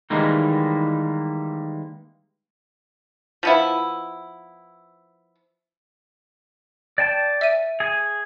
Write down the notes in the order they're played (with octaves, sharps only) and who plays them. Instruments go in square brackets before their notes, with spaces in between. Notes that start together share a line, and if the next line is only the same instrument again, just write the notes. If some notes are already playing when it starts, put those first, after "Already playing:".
[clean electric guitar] D#3 E3 G3 G#3 A#3 D#4
[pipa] F3 B3 E4
[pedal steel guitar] D5 G5 A5
[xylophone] E5 D#7
[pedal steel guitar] G#4 G#5